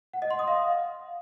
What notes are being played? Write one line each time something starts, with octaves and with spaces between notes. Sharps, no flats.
F#5
D#5
C6
D#6
F5